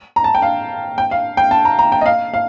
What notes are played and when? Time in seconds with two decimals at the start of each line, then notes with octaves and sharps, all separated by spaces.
0.16 A#5
0.24 A5
0.35 G5
0.42 F5
0.98 G5
1.11 F5
1.37 G5
1.51 A5
1.65 A#5
1.79 A#5
1.92 G5
2.01 D#5
2.06 F5
2.34 F5